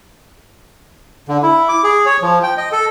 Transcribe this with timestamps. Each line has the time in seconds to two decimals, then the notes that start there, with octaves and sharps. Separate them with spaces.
1.29 D3
1.43 E4
1.68 D6
1.84 G#4
2.06 C#5
2.22 F3
2.43 G5
2.57 D#5
2.72 A4